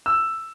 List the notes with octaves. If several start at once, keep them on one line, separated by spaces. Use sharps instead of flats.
E6